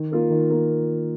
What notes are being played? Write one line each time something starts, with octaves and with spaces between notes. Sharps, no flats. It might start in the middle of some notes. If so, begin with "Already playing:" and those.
Already playing: D#3
A#3 F4 A#4
D#3
A#3 F4 A#4